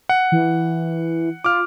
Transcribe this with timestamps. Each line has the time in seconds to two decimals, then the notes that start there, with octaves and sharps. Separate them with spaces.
0.09 F#5
0.32 E3
1.44 F4 D6 F6